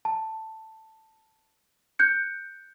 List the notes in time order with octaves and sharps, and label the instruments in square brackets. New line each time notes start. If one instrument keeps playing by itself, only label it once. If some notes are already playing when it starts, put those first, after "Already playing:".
[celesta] A5
F#6 G6 C#7